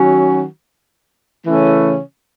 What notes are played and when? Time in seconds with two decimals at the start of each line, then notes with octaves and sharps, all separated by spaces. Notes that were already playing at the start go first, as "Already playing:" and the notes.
Already playing: D#3 F#3 C#4 F#4
1.45 C#3 E3 A3 C#4